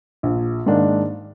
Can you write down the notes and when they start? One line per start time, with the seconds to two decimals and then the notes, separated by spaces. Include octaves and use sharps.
0.23 A#1
0.66 G#2 D#3 A#3 D4